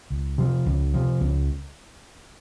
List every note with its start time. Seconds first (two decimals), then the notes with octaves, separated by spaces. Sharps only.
0.10 C#2
0.38 C3 F3
0.66 C#2
0.94 C3 F3
1.21 C#2